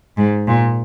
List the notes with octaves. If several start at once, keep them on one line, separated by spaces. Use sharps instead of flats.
G#2
A#2